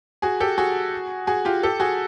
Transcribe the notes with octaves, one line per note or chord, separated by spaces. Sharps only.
F#4 G#4
G4 A4
F#4 G#4
F#4 G#4
F4 G4
G4 A4
F#4 G#4